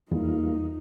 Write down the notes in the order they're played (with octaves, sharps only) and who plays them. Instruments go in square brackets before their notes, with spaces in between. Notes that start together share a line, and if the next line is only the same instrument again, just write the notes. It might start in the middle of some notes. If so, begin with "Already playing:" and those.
[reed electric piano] E2 [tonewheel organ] G3 A#3 F4 [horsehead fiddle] D#4